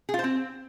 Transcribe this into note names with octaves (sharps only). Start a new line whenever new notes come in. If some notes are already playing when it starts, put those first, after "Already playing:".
G#4
F4
C5
C4